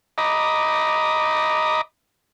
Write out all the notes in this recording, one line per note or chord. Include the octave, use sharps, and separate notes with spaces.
D#5 A#5 B5 D6 D#6